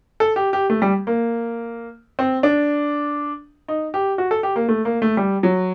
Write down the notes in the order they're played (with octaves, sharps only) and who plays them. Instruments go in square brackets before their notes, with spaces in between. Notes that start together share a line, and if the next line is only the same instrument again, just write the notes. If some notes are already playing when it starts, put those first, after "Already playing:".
[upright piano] A4
G4
G4
A3
G3
A#3
C4
D4
D#4
G4
F#4
A4
G4
A#3
A3
A#3
A3
G3
F#3